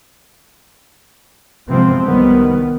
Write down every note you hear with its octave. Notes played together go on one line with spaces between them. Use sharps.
C3 F3 G#3 B3 C4
C2 D#3 G3 B3